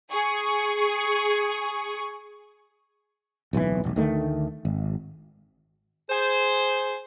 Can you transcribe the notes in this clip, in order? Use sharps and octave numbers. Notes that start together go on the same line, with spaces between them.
G#4 C#6
D1 B1 A2 E3
E1 B1
D2 D#3 A3
G#1
G#4 C5